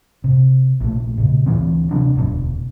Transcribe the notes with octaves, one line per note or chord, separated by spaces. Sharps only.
C3
A#1 A3
A#2 C#3
D2 E3 C4
C3 F#3 C4 D4
E1 D2 G#2 B2